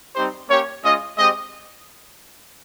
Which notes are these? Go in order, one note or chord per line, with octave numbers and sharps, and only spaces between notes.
G3 C4 D#4 G4 C5
A#3 C#4 G4 C#5
G#3 C#4 F4 D#5
G#3 C4 G4 D#5